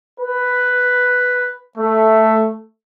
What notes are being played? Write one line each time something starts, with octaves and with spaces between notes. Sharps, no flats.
B4
A3